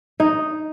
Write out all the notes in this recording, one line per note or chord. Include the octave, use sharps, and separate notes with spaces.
D#4